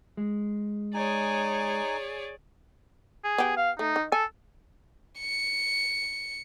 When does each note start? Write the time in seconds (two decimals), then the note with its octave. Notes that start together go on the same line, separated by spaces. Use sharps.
0.17 G#3
0.94 D#4 G#4 C#5 D5 G#5
3.24 G#4
3.38 B3 G4
3.57 F5
3.79 A3 D#4
3.96 D#3
4.12 A4 G#5
5.19 C#7